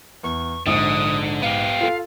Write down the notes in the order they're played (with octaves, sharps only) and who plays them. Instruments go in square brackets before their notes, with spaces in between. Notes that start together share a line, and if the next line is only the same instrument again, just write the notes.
[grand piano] E2 [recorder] C#6
[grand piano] A#1 G#2 [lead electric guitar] D3 [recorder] D#6
[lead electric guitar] B3 G4 [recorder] F5
[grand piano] F4 A4